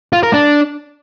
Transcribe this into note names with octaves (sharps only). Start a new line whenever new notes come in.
F4
A#4
D4